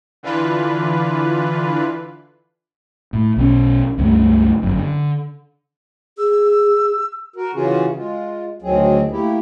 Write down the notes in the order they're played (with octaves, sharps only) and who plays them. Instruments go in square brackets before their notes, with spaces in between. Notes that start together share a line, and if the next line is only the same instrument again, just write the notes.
[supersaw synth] D3 E3 D4 F4 B4
[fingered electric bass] A2
B1 B2 D3 C#4
C#2 G2 G3 A3
G1 F#2
D3
[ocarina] G#4 [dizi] E6
[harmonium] F#4 A#4
C#3 E3 C#4 F4 F#4 G#4
G#3 F4
D2 D#3 F#3 C4 G#4
A3 A#3 E4 G4